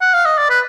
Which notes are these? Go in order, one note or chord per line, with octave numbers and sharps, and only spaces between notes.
F#5
F5
D#5
D5
B4